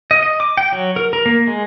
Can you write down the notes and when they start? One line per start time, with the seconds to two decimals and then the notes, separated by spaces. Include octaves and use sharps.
0.11 D#5
0.23 D#5
0.40 D6
0.57 G5
0.72 F#3
0.96 A#4
1.13 A#4
1.26 A#3
1.47 G#3